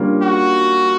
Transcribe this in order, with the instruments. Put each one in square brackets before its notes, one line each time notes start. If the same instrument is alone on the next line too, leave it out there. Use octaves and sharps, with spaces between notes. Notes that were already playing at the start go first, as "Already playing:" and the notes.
Already playing: [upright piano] D3 G3 A#3 C#4 F4
[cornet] F#4